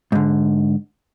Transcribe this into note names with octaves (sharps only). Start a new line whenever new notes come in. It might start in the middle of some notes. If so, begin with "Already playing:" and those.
G#2 D3